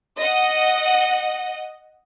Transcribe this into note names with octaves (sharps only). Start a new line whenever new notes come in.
D#5 F#5